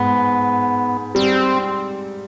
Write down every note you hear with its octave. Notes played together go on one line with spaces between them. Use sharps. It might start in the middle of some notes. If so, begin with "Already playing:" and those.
Already playing: G#2 G#3 B3
G3 C4